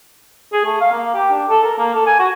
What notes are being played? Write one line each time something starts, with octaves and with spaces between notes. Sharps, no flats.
G#4
A3
F5
A#3
G4
D4
A4
A#4
A#3
A4
G#5
F#4